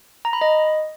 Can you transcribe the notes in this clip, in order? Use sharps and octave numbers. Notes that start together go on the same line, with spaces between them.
A#5
B5
D#5